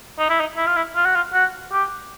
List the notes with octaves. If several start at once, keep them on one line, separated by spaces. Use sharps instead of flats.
D#4
E4
D#4
E4
F4
E4
F4
F#4
F4
F#4
G4